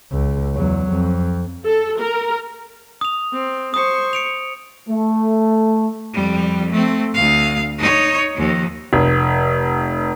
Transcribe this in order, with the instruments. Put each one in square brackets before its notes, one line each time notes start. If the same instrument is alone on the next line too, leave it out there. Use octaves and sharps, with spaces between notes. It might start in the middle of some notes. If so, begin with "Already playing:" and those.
[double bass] C#2
E2 F#3
F2
[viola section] A4
A#4
[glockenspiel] D#6 F7
[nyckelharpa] C4
[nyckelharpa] C5 C#6 [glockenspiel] D#6
[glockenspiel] C#7 D7 F7
[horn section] A3
[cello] F2 G3
A3 C4
D2 F5
D#4 C#5
D#2 F3
[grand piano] F1